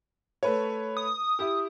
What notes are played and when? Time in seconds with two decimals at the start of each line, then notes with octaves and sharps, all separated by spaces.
0.43 A3 B4 C#5
0.97 D#6
1.39 E4 G4